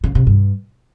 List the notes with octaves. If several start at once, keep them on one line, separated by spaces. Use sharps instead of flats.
C#3
C3
G2